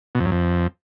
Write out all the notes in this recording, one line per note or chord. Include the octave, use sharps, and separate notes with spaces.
B2
F2
F#2
F2